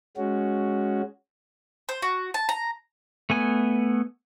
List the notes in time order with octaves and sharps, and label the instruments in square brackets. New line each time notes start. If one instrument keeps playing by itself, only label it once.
[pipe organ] G#3 C#4 F#4
[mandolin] C5
F#4
A5
A#5
[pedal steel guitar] A3 B3 G#5